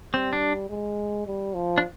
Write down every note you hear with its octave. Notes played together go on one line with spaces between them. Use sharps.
G3 C4
D4
G#3
G3
F3
D4